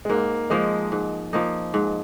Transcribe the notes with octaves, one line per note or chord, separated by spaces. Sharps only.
G#3
G#2 A#3
F3 G#3 A#3 D#4
G#2
F3 A#3 D#4
G#2